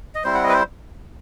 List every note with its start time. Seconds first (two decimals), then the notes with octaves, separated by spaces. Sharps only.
0.15 D#5
0.24 G3 C4 E4 C5
0.34 F#5
0.44 D#5
0.49 B4
0.53 C5